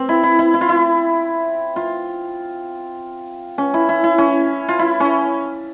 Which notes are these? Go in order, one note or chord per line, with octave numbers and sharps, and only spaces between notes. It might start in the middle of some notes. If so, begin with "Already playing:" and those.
Already playing: C4
E4
E4
E4
E4
F4
E4
F4
C#4
E4
E4
E4
C#4
F4
E4
C#4